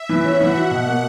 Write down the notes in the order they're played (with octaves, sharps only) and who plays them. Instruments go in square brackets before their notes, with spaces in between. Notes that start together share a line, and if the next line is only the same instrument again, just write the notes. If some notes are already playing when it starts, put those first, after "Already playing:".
Already playing: [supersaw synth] E5
[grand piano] E3
[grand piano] C#4 [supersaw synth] F#5
[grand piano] E3
[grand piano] F#4 [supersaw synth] F#5
[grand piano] B2
A#3